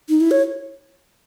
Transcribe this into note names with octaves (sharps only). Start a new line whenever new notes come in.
D#4
E4
C#5